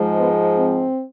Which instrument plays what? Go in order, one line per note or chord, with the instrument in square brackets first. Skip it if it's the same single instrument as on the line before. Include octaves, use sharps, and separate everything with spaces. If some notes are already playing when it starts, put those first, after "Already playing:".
Already playing: [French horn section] G#2 F3 G#3
B3
C4